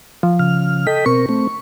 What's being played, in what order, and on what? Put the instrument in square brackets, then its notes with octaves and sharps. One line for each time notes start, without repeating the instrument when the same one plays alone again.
[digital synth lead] F3
[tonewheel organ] C#3 F6
[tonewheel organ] A4 D#5 G5 [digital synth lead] B6
[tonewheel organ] B2 C4 A#4 [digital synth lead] C#6
[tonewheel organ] A3 C4